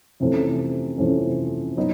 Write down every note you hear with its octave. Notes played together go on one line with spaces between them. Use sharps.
F2 C3 E3 A3 C#4
F2 C3 E3 A3 C#4
F#3 B3 D#4